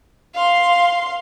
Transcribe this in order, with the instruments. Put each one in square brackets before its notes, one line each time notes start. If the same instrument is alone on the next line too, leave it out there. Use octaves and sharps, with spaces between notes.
[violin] F5 C6